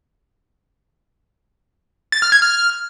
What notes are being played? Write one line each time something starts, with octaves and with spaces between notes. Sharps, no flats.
A6
F6
G#6
F6